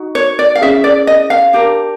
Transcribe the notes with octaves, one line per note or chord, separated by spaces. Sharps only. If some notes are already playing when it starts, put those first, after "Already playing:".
Already playing: D#4 F#4
C#5
D5
F5
C#4 E4 G#4 E5
D5
D#5
F5
D4 G4 A#4